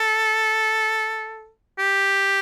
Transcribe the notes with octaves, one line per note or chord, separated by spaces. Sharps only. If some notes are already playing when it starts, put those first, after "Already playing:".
Already playing: A4
G4